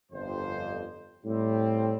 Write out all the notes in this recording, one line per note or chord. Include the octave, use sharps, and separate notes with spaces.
G1 F2 C5
A2 G3 C4